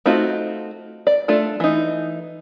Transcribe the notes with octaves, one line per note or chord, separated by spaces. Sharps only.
A3 C4 D#4 F4 F#4
D5
A3 D4 F4 A4
E3 D#4